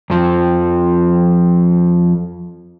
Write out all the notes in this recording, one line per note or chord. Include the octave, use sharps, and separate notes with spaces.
F2 F3